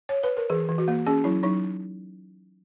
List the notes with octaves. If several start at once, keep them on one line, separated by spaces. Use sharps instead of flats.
C#5
B4
A#4
E3 G#4
E3
F#4
A#3
C#4 G#4
F#3 E4
F#3 D#4